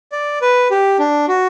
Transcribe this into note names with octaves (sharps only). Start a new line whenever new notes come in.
D5
B4
G4
D4
F#4